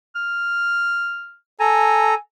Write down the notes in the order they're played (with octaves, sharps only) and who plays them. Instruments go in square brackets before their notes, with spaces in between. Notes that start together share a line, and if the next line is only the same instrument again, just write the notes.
[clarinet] F6
[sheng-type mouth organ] A4 A#5 [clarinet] G#5